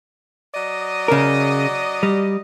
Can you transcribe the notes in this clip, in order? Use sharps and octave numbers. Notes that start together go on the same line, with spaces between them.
F#3 D5 D#5
C#3 A#4
G3